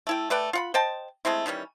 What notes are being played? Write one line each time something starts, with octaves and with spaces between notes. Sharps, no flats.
A3 E4 G5
A3 B4 D5 G5
F4 F#5 B5
C5 D#5 G5 A5
G#3 A3 C4 E4
D#3 E3 G3 C#4